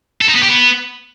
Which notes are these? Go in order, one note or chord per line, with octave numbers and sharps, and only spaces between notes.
A4
D#4
B3
G4
B3